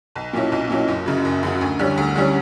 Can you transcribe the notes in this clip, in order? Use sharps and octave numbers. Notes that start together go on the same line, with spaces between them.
B1
A#2 F#3 C#4 E4
B1
A#2 F#3 C#4 E4
F#1
F#2 C#3 F#3
F#1
F#2 C#3 F#3
D2
D3 G3 C#4
D2
D3 G3 C#4